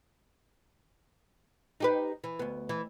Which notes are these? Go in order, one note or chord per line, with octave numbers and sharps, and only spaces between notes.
D#4 G4 B4
E3
D2 B3
E3